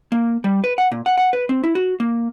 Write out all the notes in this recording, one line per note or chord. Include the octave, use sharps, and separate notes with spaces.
A#3
G3
B4
F#5
A#2
F#5
F#5
B4
C4
E4
F#4
A#3